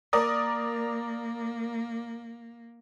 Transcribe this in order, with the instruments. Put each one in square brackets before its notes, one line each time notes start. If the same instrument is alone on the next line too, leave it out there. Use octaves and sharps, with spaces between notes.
[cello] A#3 [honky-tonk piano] A#4 D5 D#6